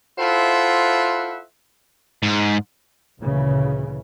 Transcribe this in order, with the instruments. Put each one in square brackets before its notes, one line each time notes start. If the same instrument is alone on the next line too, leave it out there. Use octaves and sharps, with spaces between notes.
[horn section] E4 F4 A4 C5 E5 F#5
[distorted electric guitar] G#2
[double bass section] D2 A#2 C#3 E3